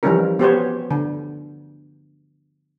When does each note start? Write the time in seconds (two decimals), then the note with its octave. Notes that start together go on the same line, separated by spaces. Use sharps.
0.03 E3 F3 G3 C#4 D#4 A#4
0.39 B3 G4 C5 C#5
0.91 D3